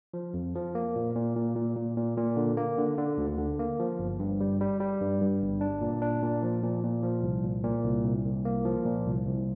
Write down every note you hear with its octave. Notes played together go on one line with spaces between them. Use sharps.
F3
F2
F3
A#3
A#2
A#2
A#2
A#2
A#2
A#2
A#2
D3
A#3
D3
D3
D2
D3
A#3
F3
G1
G2
G3
G3
G3
G2
G2
G1
D4
A#2
D4
A#2
F3
A#2
A#2
F3
C2
A#2
A#2
C2
C2
C2
A#3
F3
A#2
C2
C2